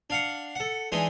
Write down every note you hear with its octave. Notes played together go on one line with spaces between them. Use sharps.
D4 F5 F#5
A4 F#5
E3 G#3 D4 D#4